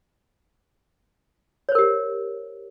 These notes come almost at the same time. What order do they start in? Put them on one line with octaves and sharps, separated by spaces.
C#5 C5 A#4 G4